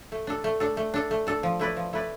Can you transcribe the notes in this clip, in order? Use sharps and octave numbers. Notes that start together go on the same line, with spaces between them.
A3
D4 A4
A3
D4 A4
A3
D4 A4
A3
D4 A4
F3
A3 E4 B4 D5
F3
A3 E4 B4 D5